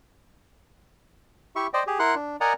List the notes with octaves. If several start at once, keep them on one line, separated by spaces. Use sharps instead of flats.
E4 G4 E5 C#6
C5 D5 D#5 G5
G4 G#4
E4 A#4 F#5 C6 F#6
D4
A#4 D5 D#5 F#5 G#5 A#5